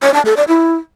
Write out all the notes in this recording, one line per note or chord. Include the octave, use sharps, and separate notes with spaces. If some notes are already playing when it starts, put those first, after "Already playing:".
C#5
A5
A4
D5
E4